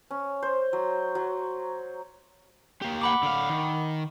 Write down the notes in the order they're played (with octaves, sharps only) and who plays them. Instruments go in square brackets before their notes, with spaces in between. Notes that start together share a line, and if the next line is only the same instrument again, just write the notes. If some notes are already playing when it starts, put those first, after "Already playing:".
[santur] C#4
C5
F#3
F#3
[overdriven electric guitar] A#3 G4
[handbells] F#5 B5 D6
[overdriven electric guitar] D3 F5
D#3